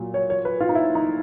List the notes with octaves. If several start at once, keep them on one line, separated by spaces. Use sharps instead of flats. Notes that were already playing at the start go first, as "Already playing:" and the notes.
Already playing: A#2 F#3
C#5
C#5
B4
F4
D#4
E4
D#4